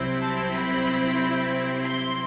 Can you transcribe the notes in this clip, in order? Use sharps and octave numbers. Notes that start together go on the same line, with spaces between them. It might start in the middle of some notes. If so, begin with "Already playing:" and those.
Already playing: C2 C3 F#3 C4 E4
A5
B5
C6